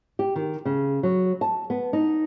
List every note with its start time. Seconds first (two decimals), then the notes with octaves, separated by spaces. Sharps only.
0.19 G4
0.36 D#3
0.65 C#3
1.03 F#3
1.41 A5
1.70 B3
1.93 D#4